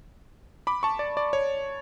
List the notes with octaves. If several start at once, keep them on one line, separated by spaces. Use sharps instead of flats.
B5 D6
A5 C#6
D5
D5
C#5